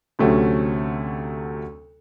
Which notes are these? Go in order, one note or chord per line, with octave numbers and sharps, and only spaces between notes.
D2 C3 F#3 A3 C4 C#4